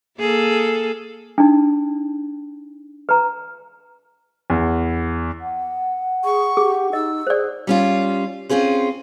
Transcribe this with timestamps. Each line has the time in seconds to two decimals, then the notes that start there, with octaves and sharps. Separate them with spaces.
0.18 A#3 G#4 A4
1.38 D4 D#4
3.09 B4 A#5
4.50 E2
5.39 F#5
6.24 G#4 C#6
6.57 G4 G#4
6.93 D#4 D#5 E6
7.27 G#4 C5 D5
7.67 G3 C#4 F4
8.49 C4 C#4 F4 G#4 C5